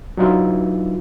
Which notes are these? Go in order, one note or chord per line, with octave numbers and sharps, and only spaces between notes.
F#3 D4 D#4 F4 B4 E5